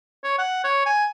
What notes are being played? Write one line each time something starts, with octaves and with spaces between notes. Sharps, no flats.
C#5
F#5
C#5
G#5